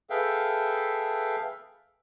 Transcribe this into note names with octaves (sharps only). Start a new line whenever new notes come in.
G#4 A4 B4 E5 F5 G5